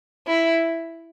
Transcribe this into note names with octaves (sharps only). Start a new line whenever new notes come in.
E4